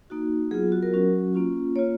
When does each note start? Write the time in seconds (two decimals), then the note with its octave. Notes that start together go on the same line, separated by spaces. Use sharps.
0.10 A#3 D#4 F#4
0.51 F#3 B3 F4 G#4
0.72 F#4
0.83 A#4
0.93 F#3 C#4 F#4
1.34 A#3 C#4 F4
1.75 A#3 C#5
1.79 F4